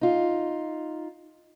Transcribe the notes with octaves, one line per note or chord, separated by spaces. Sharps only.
D#4 F4